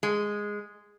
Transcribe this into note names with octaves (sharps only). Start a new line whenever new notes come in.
G#3